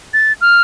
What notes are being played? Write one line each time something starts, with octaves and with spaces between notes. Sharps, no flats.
A6
F6